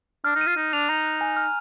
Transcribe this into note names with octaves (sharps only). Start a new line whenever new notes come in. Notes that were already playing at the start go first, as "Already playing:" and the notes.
D4 F6
D#4
D#7
F4
D#4 F6
D4 F7
D#4 A#5
F#6
G#5
F6